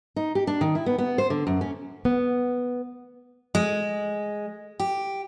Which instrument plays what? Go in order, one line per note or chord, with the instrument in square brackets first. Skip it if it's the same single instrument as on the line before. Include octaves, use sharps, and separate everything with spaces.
[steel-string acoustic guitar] D#4
G4
D4
D#3
E4
B3
B3
C5
D3
F#2
C#4
[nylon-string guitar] B3
[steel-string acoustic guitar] G#3
G4